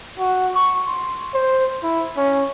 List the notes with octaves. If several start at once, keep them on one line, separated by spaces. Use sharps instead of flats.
F#4
C#6
C6
C5
E4
C#4